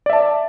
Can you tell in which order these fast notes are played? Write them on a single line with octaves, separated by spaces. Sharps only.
D5 E5 A5